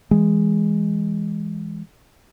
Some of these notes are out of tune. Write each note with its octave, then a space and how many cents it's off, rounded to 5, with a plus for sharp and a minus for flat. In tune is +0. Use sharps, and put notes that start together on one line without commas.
E3 +0 G#3 -10